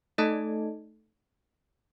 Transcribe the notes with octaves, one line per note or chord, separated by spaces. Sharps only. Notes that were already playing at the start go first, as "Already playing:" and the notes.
A3 D#4 A4 D#5 A5